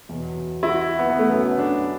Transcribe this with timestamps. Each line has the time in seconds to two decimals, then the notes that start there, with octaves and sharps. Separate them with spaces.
0.09 E2 B2 F#3
0.63 E4
0.69 F#4
0.99 B3
1.10 B3
1.19 A3
1.29 F#2 C#3 F#3 B3
1.59 D4